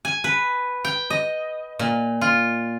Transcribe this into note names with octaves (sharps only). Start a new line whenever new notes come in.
G#5
B4
G5
D#5
A#2
F4